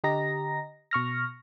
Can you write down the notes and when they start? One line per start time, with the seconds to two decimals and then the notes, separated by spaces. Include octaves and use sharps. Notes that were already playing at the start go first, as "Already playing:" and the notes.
0.04 D3 G4 D#5 A#5 A#6
0.91 B2 C#6 F6 A#6